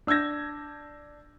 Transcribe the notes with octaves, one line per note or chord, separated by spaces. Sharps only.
D4 E6 G6 G#6 A#6